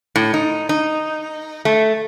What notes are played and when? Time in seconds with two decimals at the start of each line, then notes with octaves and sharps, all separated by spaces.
0.16 A2
0.34 D#4
0.69 D#4
1.65 A3